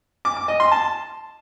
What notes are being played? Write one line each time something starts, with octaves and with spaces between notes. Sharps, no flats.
D6
D6
D#5
C6
A5